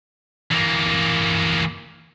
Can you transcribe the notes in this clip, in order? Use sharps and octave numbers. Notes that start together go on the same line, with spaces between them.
E3 A#3